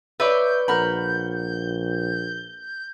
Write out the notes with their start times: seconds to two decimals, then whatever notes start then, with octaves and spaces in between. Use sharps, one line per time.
0.20 B4 C#5 D5 E5 G6
0.68 A#1 A#4 F#5 B5